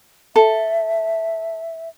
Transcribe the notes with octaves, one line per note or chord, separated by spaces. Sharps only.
A4 E5